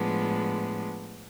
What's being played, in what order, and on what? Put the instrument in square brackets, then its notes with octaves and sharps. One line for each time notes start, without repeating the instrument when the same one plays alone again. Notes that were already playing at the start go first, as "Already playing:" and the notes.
Already playing: [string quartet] A2 F3 G#3 B3 D4